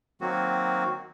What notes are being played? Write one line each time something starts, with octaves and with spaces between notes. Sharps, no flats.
D#3 F#3 A#3 C4 F#4